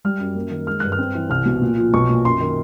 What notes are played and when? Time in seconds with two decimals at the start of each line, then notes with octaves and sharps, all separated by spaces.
0.05 G3 F6
0.20 F#2
0.35 A#3
0.51 D#3
0.67 G#3 F6
0.80 G2 F#6
0.92 F6
0.98 C4
1.15 E3
1.30 C2 F6
1.45 B2
1.62 A#2
1.77 F3
1.94 B1 C#6
2.09 A#2
2.25 F#2 C6
2.40 D#3